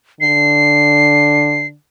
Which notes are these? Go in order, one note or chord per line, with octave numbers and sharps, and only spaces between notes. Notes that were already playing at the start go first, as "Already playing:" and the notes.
D3 C7